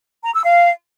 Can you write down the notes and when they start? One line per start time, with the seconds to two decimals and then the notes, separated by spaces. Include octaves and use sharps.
0.23 A#5
0.33 E6
0.44 F5